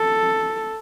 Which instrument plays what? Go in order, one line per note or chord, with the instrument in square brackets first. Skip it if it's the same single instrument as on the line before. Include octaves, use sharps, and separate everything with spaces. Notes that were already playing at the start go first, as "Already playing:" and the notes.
Already playing: [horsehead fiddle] A4